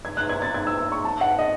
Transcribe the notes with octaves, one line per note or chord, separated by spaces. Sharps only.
G#6
F#6
G#6
A6
G#6
E6
C#6
A5
F#5
D#5